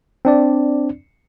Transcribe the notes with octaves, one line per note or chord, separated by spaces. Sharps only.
C4 D4 D5